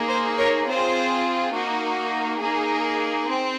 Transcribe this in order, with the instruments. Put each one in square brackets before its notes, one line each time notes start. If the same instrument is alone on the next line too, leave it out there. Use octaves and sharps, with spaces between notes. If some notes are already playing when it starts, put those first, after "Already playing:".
Already playing: [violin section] A#3 D#4 G#4
C5
A#4 C#5
C4 F4 G#4 C5
A#3 D#4 F#4
A#3 D#4 G#4
C4